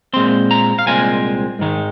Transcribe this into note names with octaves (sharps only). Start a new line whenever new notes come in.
A#2 G#3 C4 C6
A#5
F5
C2 A#2 G#3 C4 G#5
G#2 D#3 G#3